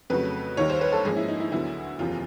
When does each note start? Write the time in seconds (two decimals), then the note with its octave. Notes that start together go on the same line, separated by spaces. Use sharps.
0.10 F2 C#3 F#3 A3 B4
0.57 D#2 D#3 G3 C#5
0.70 C5
0.81 B4
0.92 A4
1.05 G#2 F3 A#3 C#4 G#4
1.16 E4
1.28 D#4
1.40 E4
1.52 D2 D3 F#3 B3 E4
1.99 F#1 E2 C3 F3 F4